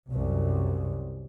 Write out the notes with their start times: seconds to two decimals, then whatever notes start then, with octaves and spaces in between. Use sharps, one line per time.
0.10 C2 F#2